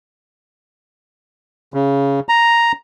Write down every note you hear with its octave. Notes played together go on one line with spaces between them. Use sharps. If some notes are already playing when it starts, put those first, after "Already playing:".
C#3
A#5